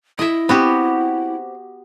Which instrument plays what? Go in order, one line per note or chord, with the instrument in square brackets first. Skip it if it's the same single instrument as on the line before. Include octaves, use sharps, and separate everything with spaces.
[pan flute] E4 [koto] D#5 E5
[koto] B3 F#4 G4 [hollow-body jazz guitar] C4